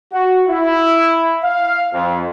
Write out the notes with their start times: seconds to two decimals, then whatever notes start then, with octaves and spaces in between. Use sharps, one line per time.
0.13 F#4
0.48 E4
1.44 F5
1.93 F2